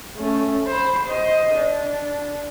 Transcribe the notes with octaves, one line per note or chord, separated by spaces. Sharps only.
A3 C#4
C5 B5
C5 D#5
D4